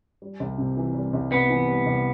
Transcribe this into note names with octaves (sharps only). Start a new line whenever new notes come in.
G3
C2
C3
E3
G3
C2
C3 B3
E3
G3
C2